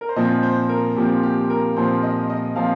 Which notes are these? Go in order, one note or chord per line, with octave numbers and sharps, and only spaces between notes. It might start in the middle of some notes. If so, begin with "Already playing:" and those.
A#4
C5
A#2 F3 C4 D#5
C5
A#4
A#2 F3 C4 G4
G4
A#4
A#2 F3 C4 C5
D#5
D#5
A#2 F3 C4 F5